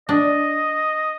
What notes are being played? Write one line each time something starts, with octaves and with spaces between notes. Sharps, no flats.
D4 D#5